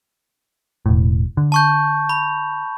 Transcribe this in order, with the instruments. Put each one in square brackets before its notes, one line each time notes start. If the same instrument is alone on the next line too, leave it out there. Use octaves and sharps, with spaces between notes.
[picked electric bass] E1 A2
D3
[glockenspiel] A5 C#6 G6
B5